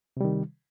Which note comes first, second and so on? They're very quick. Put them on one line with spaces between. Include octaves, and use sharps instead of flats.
C3 G3 D#3